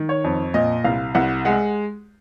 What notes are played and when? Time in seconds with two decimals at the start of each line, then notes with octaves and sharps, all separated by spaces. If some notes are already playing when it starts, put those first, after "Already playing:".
Already playing: D#3
0.09 C#5
0.24 F2
0.54 A#2 D#5
0.84 C2 F5
1.15 C2 F#5
1.45 G#3 F#5